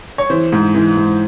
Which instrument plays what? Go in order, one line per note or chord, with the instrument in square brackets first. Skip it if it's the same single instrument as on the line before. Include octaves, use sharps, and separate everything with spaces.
[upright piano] C#5
E3 C5
G#2
E3
G#2